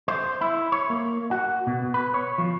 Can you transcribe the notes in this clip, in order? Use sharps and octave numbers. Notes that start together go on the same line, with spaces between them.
C5
E4
C#5
A#3
F#4
B2
B4
C#5
F3